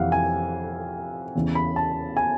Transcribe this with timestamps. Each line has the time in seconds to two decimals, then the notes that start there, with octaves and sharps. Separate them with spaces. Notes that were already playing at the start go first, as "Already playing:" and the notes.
Already playing: F2 C3 E3 F5 F#5
0.12 G#5
1.35 E2 C#3 E3
1.55 B5
1.76 A5
2.17 G#5